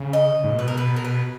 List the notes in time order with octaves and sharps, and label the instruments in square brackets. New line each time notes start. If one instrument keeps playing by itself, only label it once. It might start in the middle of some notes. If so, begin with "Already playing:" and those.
Already playing: [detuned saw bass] C#3
[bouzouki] D#5
[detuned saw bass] G#2
A#2
[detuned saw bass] B2 [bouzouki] B4
[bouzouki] A#4
B4
A#4
B4